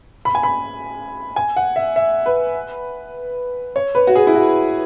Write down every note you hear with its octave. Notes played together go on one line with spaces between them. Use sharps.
B5
G#5
B5
G#5
F#5
E5
E5
B4
C#5
B4
F#4
G#4
E4
F#4